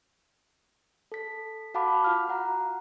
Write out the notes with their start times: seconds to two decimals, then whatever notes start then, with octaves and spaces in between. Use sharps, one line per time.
1.12 A4 B6
1.74 F#4 F5 F#5 A5 B5 D6
2.04 F4 F5 F6
2.28 F#4 F#5 A#5